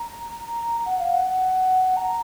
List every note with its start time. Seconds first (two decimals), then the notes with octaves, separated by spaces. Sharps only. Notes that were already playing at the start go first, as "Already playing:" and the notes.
Already playing: A#5
0.86 F#5
0.99 F5
1.13 F#5
1.97 A#5